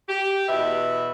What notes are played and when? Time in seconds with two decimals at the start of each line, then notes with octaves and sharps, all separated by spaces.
0.08 G4
0.48 E2 B2 B4 E5